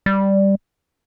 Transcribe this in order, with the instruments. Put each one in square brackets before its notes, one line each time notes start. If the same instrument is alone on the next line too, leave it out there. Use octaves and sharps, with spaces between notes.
[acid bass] G3